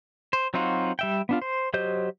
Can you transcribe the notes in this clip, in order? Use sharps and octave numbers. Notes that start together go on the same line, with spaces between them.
C5
F#3 C4 D#4 F4 F#4
G3 E5 G5
B3 D4 F4
C5
F#3 G4 C5 D#5 G6